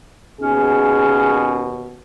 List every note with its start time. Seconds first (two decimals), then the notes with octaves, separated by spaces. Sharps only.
0.41 D#2 B2 C#4 G#4